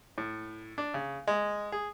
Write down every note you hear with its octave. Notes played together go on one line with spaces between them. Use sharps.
A2
D4
C#3
G#3
G#4